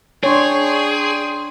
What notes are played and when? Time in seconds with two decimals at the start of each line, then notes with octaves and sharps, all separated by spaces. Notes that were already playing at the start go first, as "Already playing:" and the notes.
0.23 D4 G#4 C#5 G5 C6